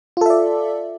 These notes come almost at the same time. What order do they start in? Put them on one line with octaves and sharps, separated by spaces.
F4 A4 E5 D5